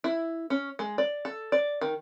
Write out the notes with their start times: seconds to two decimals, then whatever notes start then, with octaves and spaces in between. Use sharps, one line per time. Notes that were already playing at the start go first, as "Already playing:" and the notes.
0.04 E4
0.50 C#4
0.79 G#3
0.98 D5
1.25 A4
1.52 D5
1.81 D#3